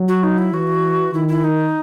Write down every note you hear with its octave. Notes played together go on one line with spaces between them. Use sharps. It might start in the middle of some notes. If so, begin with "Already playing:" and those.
Already playing: F#3
F#4
D#4
E4
E3 F#4
D#3 E4
E4
D#4